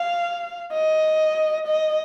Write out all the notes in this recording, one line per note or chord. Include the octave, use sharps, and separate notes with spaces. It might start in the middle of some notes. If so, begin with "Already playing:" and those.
Already playing: F5
D#5
D#5